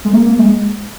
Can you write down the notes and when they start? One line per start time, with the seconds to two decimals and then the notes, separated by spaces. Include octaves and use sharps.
0.05 G#3
0.13 A#3
0.26 A#3
0.39 G#3